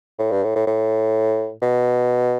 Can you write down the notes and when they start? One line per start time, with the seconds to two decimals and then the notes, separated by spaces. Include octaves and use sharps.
0.19 A2
0.31 G2
0.44 A2
0.55 A2
0.67 A2
1.62 B2